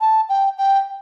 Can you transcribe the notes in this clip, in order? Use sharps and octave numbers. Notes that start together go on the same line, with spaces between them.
A5
G5
G5